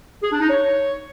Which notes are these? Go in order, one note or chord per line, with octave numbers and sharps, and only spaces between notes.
G#4
D4
D#4
C#5